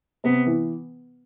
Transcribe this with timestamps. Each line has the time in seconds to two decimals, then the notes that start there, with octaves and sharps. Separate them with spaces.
0.24 C3 B3
0.46 E3